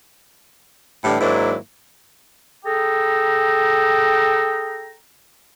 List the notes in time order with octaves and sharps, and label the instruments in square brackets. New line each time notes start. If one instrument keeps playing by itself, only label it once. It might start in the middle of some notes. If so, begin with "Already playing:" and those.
[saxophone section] A2 D3 E3 G3
G#2 D#3 F#3 A#3 D4 E4
[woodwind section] G#4 A4 G5 A#5